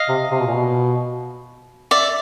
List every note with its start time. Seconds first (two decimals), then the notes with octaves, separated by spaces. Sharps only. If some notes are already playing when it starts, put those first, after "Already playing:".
Already playing: D#5 F5
0.09 C3
0.31 C3
0.39 B2
0.47 A#2
0.54 B2
1.91 D5 E5